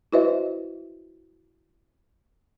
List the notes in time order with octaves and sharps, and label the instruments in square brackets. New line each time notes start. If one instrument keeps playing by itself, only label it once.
[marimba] E4 F#4 B4 C5 D#5 E5